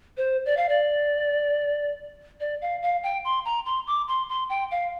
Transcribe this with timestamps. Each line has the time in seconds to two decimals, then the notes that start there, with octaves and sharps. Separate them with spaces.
0.17 C5
0.45 D5
0.57 F5
0.69 D5
2.40 D5
2.62 F5
2.82 F5
3.03 G5
3.25 C6
3.45 A#5
3.66 C6
3.87 D6
4.08 C6
4.29 C6
4.49 G5
4.71 F5